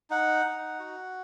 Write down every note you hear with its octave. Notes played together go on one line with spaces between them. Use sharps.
D#4 F#5
D#4
F#4